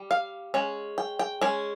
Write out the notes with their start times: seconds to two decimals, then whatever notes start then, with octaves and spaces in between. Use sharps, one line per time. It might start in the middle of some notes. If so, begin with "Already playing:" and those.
Already playing: G3
0.11 F5
0.54 G#3 C#4
0.98 G5
1.19 G5
1.41 G#3 C#4